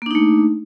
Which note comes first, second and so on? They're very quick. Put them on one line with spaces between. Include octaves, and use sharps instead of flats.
A#3 D4 D#4 A3